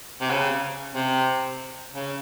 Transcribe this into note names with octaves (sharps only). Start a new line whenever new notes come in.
C3
C#3
C3
C#3